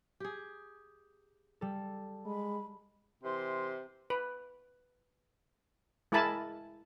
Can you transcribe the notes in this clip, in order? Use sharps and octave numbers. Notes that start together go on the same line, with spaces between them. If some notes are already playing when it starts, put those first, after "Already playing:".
G4 G#4
G3 A4
G#3 B5
C3 E3 C6
B4
G#3 E4 A#4 G#5 A5 B5